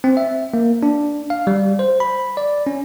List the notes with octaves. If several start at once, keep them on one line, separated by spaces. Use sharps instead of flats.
C4
E5
A#3
D4
F5
G3
C5
B5
D5
C#4